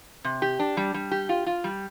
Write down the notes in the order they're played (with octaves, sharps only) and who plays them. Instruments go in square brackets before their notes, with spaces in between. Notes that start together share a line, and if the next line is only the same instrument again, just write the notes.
[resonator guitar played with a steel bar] C3
G4
D4
G3
G3
G4
F4
F4
G3